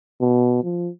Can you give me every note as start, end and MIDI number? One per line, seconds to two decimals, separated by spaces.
0.21 0.59 47
0.64 0.90 53